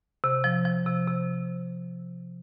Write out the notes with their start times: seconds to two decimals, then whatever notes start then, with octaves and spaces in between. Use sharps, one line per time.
0.24 C3
0.44 F3
0.65 F3
0.86 C3
1.07 C3